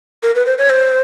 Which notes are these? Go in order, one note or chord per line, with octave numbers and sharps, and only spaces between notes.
A#4
B4
C5
C#5
C5